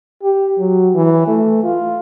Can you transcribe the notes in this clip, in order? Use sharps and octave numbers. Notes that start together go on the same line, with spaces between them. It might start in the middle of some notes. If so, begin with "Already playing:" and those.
G4
F#3
E3
A3
F4